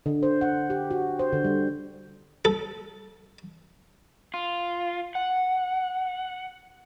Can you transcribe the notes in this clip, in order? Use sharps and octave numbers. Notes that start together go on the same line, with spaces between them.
D3
C5
F#5
G4
F#4
C5
D3
G3
A4
F4
F#5